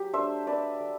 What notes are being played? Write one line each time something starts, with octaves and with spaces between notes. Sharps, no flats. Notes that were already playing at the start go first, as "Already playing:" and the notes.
Already playing: F#3 G4
A3 D4 C5 E5
B4 D5
A3